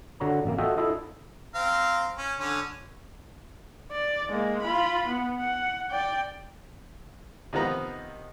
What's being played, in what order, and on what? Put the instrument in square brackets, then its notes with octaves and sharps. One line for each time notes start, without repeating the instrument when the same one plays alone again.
[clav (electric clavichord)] D3 F#4 C#5 A#5
A1 A#3
F4 F#4 A4 D#5 E5 G5
E4 F4 A4 D#5 F5
[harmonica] C4 F5 A#5
C#4
D3 C#4
[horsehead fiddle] D5
G#3 A#3
F4 B5
B3
F#5
D5 G5
[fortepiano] C3 D#3 F3 B3 A#5